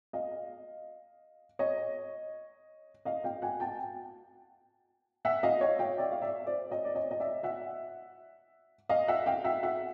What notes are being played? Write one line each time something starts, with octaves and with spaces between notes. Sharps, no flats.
D#5 F5
C#5 D#5
D#5 F5
F5 G5
F#5 G#5
G5 A5
E5 F#5
D#5 F5
C#5 D#5
F5 G5
D5 E5
F5
D5 E5
C5 D5
C#5 D#5
D5
C#5 D#5
D#5
D5 E5
E5 F#5
D#5 F5
E5 F#5
F5 G5
E5 F#5
E5 F#5